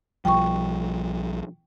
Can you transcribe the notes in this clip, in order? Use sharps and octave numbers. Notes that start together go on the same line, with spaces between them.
B1 F3 G3 G5 C#6